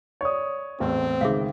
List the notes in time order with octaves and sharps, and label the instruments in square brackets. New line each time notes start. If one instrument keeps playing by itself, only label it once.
[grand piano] C#5 D5 D#6
[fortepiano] A1 E2 A3 [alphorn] C4
[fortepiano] C#2 D#3 [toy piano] G#4 E5 F5